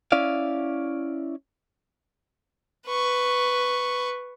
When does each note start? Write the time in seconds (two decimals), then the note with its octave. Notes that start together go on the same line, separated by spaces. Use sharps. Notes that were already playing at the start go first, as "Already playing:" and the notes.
0.12 C#4 E4 D5 F5
2.87 B4 C#6